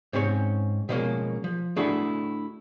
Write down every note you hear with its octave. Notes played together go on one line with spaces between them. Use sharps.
G#2 C4 C#4 B4 C#5
B2 F3 G3 G#3 A#3 C#4
F3
A3 D4 E4 F#4 G#4 A4